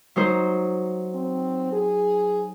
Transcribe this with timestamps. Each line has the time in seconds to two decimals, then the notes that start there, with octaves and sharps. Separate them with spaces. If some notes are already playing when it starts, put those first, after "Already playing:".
0.16 F#3 D#4 C5
1.14 C4
1.72 G#4